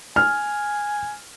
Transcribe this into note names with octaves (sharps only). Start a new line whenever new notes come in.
G#5 F6